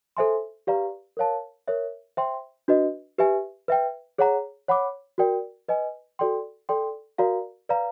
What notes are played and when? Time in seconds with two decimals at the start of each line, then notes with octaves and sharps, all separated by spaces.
0.17 A4 C5 E5 G#5 C6
0.67 G4 B4 D5 F5 A#5
1.17 A#4 C#5 F5 A5
1.68 A#4 C#5 E5
2.17 C5 E5 G5 C6
2.68 D4 F#4 B4 D#5
3.18 G4 B4 E5 G#5
3.68 B4 E5 G5
4.18 G#4 C#5 F#5 A#5
4.68 C#5 F#5 B5 D6
5.18 F#4 A#4 D5 G5
5.68 B4 D#5 G#5
6.19 F#4 A4 D5 G5 C6
6.69 A4 D5 G5 C6
7.18 F#4 A#4 D5 F5 A#5
7.69 B4 D5 F5 A#5